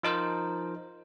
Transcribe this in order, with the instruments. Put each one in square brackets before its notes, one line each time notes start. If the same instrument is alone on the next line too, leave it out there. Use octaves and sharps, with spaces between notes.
[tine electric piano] F3 D#4 A#4 C5